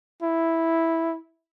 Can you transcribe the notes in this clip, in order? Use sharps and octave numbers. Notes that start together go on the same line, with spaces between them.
E4